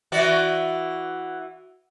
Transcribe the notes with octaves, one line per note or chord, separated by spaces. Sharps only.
E3 F#4 D5